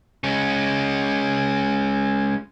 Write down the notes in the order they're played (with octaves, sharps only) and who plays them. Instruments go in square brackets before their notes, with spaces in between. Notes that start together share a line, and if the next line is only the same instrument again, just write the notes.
[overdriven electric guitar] G#3 C#4